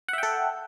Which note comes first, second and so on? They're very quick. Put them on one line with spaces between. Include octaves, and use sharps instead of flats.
F#5 E5 G5 A4